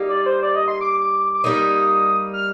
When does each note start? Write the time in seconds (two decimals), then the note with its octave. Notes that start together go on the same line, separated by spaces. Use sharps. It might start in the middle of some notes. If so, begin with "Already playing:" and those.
Already playing: G3 A#3 D#4
0.09 D5
0.26 C5
0.43 D5
0.55 D#5
0.68 C6
0.81 D6
0.93 D6
1.34 D6
1.44 G3 A#3 D#4 D#6
2.33 F6